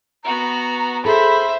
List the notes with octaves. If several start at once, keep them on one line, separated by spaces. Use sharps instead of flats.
B3 F#4 A#5
G#4 A4 C5 E5 B5